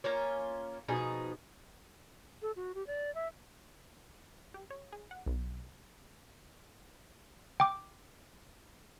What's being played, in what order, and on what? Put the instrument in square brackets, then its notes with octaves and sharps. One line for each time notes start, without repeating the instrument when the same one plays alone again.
[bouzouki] A#3 C#4 F4 C#5
B2 F3 D#4 G#4
[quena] A4
F#4
G4
D5
E5
[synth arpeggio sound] G4
C#5
G#4
F#5
B1
[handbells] G5 D6